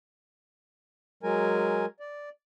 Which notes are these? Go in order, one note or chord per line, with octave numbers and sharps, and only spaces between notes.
F#3 G#3 A#4 G#5
D5